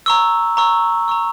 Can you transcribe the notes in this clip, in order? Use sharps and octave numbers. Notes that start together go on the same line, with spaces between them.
A#5 C#6 E6
A#5 C#6 E6
A#5 C#6 E6